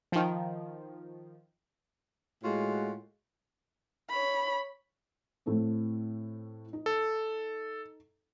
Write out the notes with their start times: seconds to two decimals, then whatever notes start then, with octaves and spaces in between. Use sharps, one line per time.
0.12 D#3 F3
2.43 A2 G#3 F4 F#4
4.10 C#5 B5
5.46 A2 A3 C4
6.73 D#4
6.86 A4